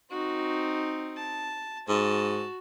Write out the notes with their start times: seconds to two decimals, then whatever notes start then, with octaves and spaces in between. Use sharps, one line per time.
0.10 C4 D#4 F#4
1.17 A5
1.89 G#2 F#4 A5